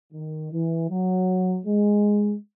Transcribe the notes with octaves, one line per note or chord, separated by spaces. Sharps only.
D#3
E3
F#3
G#3